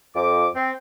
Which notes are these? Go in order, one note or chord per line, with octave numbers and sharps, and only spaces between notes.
F2 D6
C4